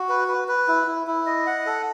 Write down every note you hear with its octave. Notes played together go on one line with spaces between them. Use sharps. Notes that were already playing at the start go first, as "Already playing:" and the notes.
Already playing: F#4
B4
B4
B4
E4
E4
E4
D#5
F#5
A4